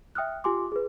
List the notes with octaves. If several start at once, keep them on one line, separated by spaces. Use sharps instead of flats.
E5 G5 D#6 F6 F#6
F4 G4 G#5 C6 D6
G#4 B4